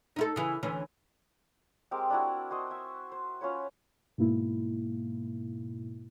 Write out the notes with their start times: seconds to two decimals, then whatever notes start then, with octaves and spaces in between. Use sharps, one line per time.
0.16 D#4 E4 A4
0.36 C#3 E3
0.63 D2 E3 C#4
1.91 G#3 C4 G4 A#4
2.10 D4 E4 F#4
2.51 F#4 C5 D#5
2.70 E5 G#5
3.12 C5
3.41 C#4 F4 B4 C#5
4.18 G#2 B2 A#3 E4